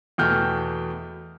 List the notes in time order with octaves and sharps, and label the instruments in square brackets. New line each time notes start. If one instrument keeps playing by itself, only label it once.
[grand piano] E2 B2 A3 G5 F6 G6